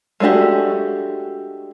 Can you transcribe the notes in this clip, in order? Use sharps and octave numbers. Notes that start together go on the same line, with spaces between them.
G#3 A3 D4 F#4 G4